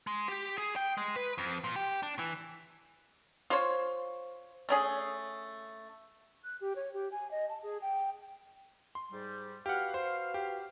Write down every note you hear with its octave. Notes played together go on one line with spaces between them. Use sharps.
G#3
G4
G#4
G5
G#3
B4
F2
A#2
G4
D4
E3
F4 C5 C#5
A3 C#4 G#4
F#6
G4
C#5
G4
G#5
D#5
A5
G#4
G5
C6
G#2 G3
F#4 G4 B4 F5 F#5
C5
G4